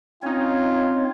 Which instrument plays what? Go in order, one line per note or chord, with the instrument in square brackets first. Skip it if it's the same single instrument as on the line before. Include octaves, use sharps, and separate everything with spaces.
[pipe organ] C4 C#5 [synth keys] C#4 D#4 [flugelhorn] F4